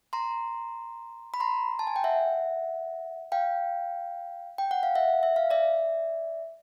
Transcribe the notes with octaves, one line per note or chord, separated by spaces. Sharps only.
A#5 C6
B5
A#5 C6
A5
G#5
G5
E5 F#5
F5 G5
G5
F#5
F5
E5 F#5
E5
F5
D5 E5